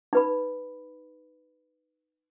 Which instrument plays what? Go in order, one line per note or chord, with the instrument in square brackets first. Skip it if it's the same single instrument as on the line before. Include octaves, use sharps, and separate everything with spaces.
[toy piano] D#4 B4 B5